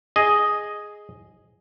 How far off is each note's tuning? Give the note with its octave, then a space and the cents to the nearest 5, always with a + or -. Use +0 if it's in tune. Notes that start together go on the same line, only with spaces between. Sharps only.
G#4 +0 D#5 +0